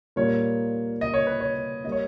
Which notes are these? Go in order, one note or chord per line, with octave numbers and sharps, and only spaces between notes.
A#2 G3 A#3 C#5
D#5
C#5
B4
C#5
G3 A#3 C#5 D#5